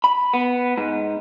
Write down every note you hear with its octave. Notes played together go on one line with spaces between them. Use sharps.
B5
B3
G#2